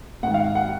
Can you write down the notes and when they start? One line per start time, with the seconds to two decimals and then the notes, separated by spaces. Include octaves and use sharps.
0.23 G#2 D#3 F#5
0.34 F5
0.45 F5
0.55 F#5